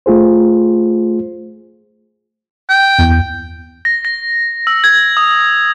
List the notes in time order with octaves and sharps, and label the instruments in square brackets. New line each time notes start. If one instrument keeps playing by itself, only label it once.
[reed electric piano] A3 F4 G#4 C5
[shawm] G5
[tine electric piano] E2
[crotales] A#6
A#6
E6
G#6
D#6